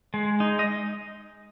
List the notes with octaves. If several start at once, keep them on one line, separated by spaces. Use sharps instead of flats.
G#3
D#4
D#5